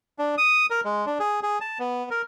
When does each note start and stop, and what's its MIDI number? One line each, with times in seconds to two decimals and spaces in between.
0.19 0.35 62
0.38 0.66 87
0.70 0.81 70
0.85 1.05 56
1.06 1.18 62
1.20 1.40 68
1.43 1.59 68
1.61 1.78 81
1.79 2.09 59
2.11 2.22 70